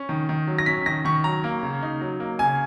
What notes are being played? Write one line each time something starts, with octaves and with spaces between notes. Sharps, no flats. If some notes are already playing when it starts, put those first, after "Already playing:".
Already playing: C#4
D#3
D#3
F#3
A#6
C#4 B6
D#3 A#6
D#3 C#6
F#3 A#5
A#3
C#3
D#4
F#3
A#3
C#3 G#5